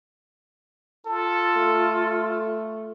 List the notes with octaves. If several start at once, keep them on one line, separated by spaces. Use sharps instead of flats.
F4 A4
A3